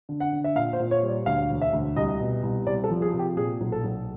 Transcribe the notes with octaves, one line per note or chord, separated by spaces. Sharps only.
D3
F#5
D3
E5
A#2 F5
C5
A#2
C#5
G3
D5
D2 F5
E1
E5
D2
C2 D#5
B2
C2
C2 D5
A4
F3
G#4
C3
G4
A#2 G#4
B1
A4
B1